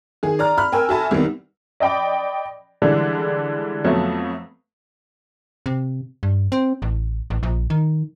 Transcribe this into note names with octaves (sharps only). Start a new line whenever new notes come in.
D#3 G#4
D5 A#5 F6
B5 F6
A#4 G5 G#5 E6
F#4 A4 E5 G#5 A5 B5
C2 D#3 G3 B3
D5 D#5 G5 B5 D6
D3 E3 G3 G#3 D4
F2 F#3 A3 B3
C3
G2
C4
A1
A1
A#1
D#3